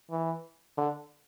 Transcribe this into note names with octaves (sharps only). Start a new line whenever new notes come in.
E3
D3